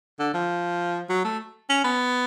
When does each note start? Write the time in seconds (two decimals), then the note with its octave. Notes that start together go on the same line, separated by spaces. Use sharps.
0.19 D3
0.34 F3
1.09 F#3
1.24 A3
1.69 C#4
1.84 B3